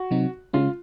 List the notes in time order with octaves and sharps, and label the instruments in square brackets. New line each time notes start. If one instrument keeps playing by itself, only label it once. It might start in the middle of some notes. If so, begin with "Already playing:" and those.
Already playing: [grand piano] F#4
[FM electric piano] C3 F#3 C4 D#4
[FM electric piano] C#3 G#3 C#4 [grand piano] F4